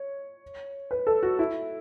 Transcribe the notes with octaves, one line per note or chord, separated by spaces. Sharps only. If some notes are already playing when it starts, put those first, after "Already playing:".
Already playing: C#5
B4
A4
F#4
E4